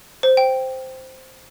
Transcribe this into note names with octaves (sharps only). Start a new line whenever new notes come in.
C5
G5